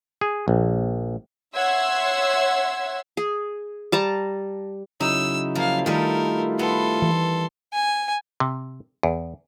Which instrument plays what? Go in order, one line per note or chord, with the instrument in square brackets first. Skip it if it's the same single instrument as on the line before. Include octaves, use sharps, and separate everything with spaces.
[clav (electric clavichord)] G#4
A#1
[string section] C#5 E5 F#5 C6 E6 G#6
[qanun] G#4
G3 A5 A#5
[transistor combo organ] C#3 F#3 E4 [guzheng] D#4 [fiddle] E6
[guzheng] F3 [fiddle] A#3 F5
[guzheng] D#3 G3 [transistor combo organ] A3 E4 F4 [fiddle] A4 A#4
[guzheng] B3 [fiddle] A4 C6
[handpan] E3
[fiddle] G#5
[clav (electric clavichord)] C3
E2